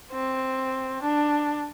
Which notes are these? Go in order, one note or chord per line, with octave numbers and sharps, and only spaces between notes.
C4
D4